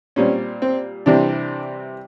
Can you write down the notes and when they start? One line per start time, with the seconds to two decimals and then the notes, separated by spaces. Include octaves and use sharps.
0.16 A#2 G3 C4 C#4
0.62 C4
1.06 C3 E3 G3 C4 D4